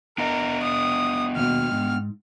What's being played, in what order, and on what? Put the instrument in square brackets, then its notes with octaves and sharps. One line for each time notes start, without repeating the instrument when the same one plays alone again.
[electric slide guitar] B3 D4 D#5 [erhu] A#4
[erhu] D#6
[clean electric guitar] D#2 B2 [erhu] F6
[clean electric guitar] G#2